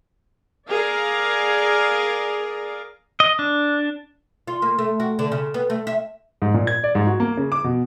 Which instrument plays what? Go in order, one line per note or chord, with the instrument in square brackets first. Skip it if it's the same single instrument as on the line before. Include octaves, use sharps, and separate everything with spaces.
[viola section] G#4 A#4 D5 F5
[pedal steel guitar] D#5
D4
[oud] F4
A#3
A3
F#4
D3
C#3
B3
A3
E5
[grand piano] G#2
A#2
G#6
D5
G#2
F#4
A#3
C#3
D6
B2